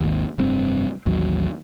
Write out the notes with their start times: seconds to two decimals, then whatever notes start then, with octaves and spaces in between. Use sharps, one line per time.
0.01 G#1 D#2
0.38 F1 G2 C4
1.06 A1 D#2 F#3